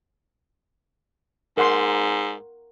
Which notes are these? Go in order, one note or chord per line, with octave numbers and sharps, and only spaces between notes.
G#2 A#4 F#5 C6